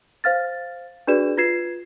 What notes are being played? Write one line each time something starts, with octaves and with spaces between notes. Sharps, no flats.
C5 F5 F6 A6
D4 F#4 G#4 B4 D5 E7
F4 B4 G#6 C7 E7